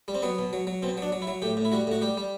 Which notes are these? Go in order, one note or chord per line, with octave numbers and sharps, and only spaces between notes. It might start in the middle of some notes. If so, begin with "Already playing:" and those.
G3
C4
F#3 B3
B2
F#3
F#3
B2 C4
F#3 D4
F#3
E4
F#3
A2 G4
A2
E4
G3 F#4
A2 F#4
G3 G4
G3